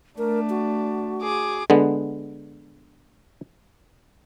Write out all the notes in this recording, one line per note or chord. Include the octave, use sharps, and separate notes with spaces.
A3 D4 A#4
F#4
G#4 D6
D3 G#3 B3